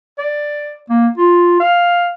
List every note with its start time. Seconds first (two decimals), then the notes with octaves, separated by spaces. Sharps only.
0.18 D5
0.90 A#3
1.18 F4
1.60 F5